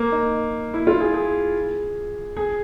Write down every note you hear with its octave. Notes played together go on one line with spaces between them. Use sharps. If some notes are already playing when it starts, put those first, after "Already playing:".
Already playing: A#3
D#4
E4
F4
G#4
G#4
G#4